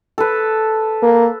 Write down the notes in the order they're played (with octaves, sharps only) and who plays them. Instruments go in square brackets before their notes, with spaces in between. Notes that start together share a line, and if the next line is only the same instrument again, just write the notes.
[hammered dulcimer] A4 B4
[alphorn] A#3